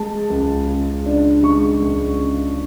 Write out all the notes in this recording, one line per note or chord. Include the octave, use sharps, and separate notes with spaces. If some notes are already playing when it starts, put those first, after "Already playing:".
Already playing: G#3 A5
C#2
C#3
D4
G#3 C#6
C#2
C#3